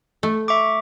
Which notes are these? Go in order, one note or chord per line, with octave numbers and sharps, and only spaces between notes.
A3
E5 C#6 D6